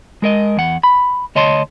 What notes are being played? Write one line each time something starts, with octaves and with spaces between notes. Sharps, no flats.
G#3 A#4 D#5
E2 F#5
B5
D2 C#5 D#5 A5 C6